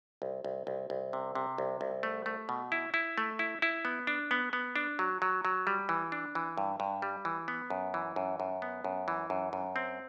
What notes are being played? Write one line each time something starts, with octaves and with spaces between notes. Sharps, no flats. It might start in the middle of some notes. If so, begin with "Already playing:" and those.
C2
C2
C2
C2
C3
C3
C2
C2
A3
A3
B2
E4
E4
A3
E4
E4
B3
D4
B3
B3
D4
F#3
F#3
F#3
G3
E3
D4
E3
G2
G2
G3
E3
B3
F#2
E3
F#2
F#2
B3
F#2
E3
F#2
F#2
C4